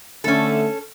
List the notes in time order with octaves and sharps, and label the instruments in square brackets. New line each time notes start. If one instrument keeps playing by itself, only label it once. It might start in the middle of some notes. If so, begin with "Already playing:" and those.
[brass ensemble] D3 A3 [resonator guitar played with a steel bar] C#4 A4